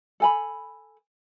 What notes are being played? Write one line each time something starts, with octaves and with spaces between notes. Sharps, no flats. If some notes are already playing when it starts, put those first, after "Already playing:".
A4 G#5 B5